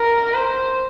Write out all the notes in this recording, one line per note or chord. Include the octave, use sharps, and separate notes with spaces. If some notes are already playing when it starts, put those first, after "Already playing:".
Already playing: A#4
C5